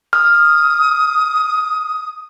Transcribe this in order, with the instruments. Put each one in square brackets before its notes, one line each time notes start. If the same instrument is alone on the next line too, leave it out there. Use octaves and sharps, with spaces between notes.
[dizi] D#6 [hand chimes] F6